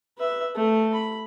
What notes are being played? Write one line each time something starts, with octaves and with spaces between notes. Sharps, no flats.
B4 E5
A3
B5